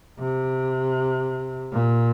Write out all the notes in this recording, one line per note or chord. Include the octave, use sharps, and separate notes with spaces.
C3
A#2